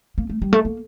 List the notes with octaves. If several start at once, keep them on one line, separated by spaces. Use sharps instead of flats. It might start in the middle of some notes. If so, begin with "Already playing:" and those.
A#3
A3
G3
A3
A#3